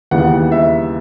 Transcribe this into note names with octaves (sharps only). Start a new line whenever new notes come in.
D#2 C#3 E3 G3 B3 F#5
E5